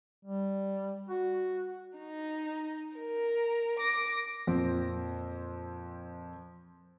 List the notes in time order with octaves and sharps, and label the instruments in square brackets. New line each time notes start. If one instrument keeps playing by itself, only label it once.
[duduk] G3
F#4
[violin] D#4
A#4
D6 A#6
[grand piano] F2 A#2 C4